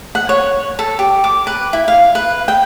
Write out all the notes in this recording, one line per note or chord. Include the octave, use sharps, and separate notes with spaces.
F#5
C#5
A4
G4
D6
B4
E4
F5
B4
G5